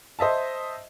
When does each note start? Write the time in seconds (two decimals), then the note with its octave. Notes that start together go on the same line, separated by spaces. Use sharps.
0.19 C5 D#5 E5 A5